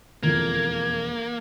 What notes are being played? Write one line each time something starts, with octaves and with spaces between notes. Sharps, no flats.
E1 F2 A#3 G#6